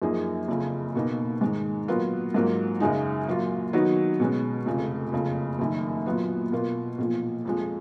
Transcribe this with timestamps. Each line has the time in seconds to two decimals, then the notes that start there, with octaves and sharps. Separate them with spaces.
0.02 F#2 F3 A#3 D#4 G#4
0.48 F#1 F2 C#3
0.95 B2 A#3 D#4
1.41 G#2 D#3 G#3
1.88 A#2 F#3 B3 F4 A#4
2.34 G#2 F#3 A#3 F4 A#4
2.80 F#2 C#3 G#3 D#4
3.27 A#2 F#3 A#3 F4
3.73 D#3 F#3 B3 D#4 F#4
4.20 B2 G#3 C#4
4.66 F1 F2 C#3
5.12 F#1 F2 C#3
5.59 F#1 F#2 D#3
6.06 A#2 F#3 B3 F4
6.52 B2 A#3 F4 A#4
6.98 B1 A#2 F3
7.45 F2 F3 G#3